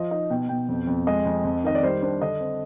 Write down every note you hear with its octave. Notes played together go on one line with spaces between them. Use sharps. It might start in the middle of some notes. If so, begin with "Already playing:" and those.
Already playing: F3 D#5
D#4 D#5
B2 G5
B2 G5
F2
F2
G#3 D#5
F2
F2
D#3 D#5
D5
G3 C5
D4 C5
D3 D#5
C4